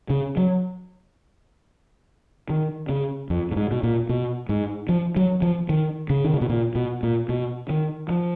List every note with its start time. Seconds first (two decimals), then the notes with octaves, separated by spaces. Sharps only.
0.10 C#3
0.37 F#3
2.50 D#3
2.89 C#3
3.30 F2
3.52 A#2
3.56 G#2
3.71 B2
3.83 A#2
4.09 B2
4.49 G#2
4.89 F3
5.16 F#3
5.42 F3
5.69 D#3
6.10 C#3
6.25 D#3
6.34 C#3
6.41 B2
6.49 A#2
6.75 B2
7.03 A#2
7.29 B2
7.70 D#3
8.09 F3